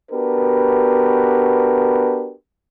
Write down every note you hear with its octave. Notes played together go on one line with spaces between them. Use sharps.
B3 D4 F#4 G4 A#4 B4